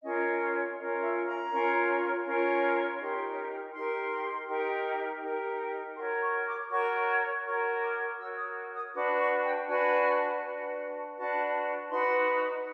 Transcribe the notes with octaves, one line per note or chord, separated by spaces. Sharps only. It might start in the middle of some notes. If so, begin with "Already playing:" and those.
C#4 F4 A#4 C#5 D#5
C#4 F4 A#4 C#5 D#5
E5
A#5
C#4 F4 A#4 C#5
C#4 F4 A#4 C#5
B5
D#4 G4 A#4 C6
D#4 G4 A#4 C6
D#4 G4 A#4
D#4 G4 A#4
F#4 A#4 C#5 C6
C#6
D6
F#4 A#4 C#5 C#6
F#4 A#4 C#5 C#6
D6
F#4 A#4 C#5 E6
D#6
D#6
D4 F#4 B4 D6
C#6
G5
D4 F#4 B4 G#5
D4 F#4 B4
D4 F#4 B4 A5
D#4 F#4 B4 C6